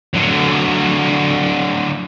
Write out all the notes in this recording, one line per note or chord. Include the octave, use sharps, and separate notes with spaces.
D3 F#3